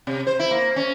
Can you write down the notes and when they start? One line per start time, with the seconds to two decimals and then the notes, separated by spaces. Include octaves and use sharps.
0.07 C3
0.27 C5
0.39 E4
0.51 A#3
0.76 C#4